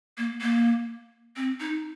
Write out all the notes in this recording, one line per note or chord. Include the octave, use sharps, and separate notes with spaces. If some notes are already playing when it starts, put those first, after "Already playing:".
A#3
A#3
C4
D#4